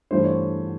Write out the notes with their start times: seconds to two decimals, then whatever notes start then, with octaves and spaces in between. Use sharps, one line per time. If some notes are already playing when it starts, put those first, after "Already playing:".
0.11 G2 E3 A3 D4 C5
0.24 C#5